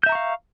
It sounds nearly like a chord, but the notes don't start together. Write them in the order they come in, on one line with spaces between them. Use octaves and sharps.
G6 E5 A#5 C#6 F5